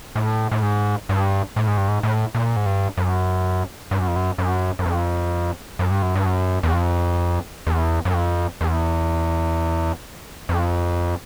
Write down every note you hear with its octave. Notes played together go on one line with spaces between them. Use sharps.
A2
A2
G#2
G2
A2
G#2
G2
G#2
A2
A#2
G#2
G2
F#2
G2
F#2
F2
F#2
F#2
F#2
F2
F#2
G2
F#2
G2
F#2
E2
F2
E2
F#2
F2
E2
F2